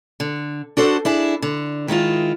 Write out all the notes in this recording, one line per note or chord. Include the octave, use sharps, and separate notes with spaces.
D3
D4 F#4 A4 C5
D4 E4 G#4
D3
D#3 G#3 E4 F4